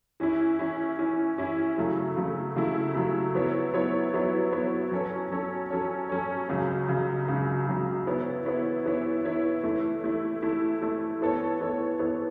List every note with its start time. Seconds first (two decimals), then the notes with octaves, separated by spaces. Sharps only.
0.20 E3 C#4 E4
0.59 E3 C#4 E4
0.99 E3 C#4 E4
1.38 E3 C#4 E4
1.77 C#3 F#3 A3 E4
2.17 C#3 F#3 A3 E4
2.56 C#3 F#3 A3 E4
2.94 C#3 F#3 A3 E4
3.35 F#3 B3 E4 C#5
3.74 F#3 B3 E4 C#5
4.14 F#3 B3 E4 C#5
4.52 F#3 B3 E4 C#5
4.91 F#3 C#4 A4 C#5
5.31 F#3 C#4 A4 C#5
5.71 F#3 C#4 A4 C#5
6.09 F#3 C#4 A4 C#5
6.49 C#2 C#3 F#3
6.88 C#2 C#3 F#3
7.28 C#2 C#3 F#3
7.67 C#2 C#3 F#3
8.06 E3 B3 E4 C#5
8.45 E3 B3 E4 C#5
8.85 E3 B3 E4 C#5
9.25 E3 B3 E4 C#5
9.63 E3 A3 E4
10.04 E3 A3 E4
10.42 E3 A3 E4
10.81 E3 A3 E4
11.21 E3 B3 A4 C#5
11.60 E3 B3 A4 C#5
11.99 E3 B3 A4 C#5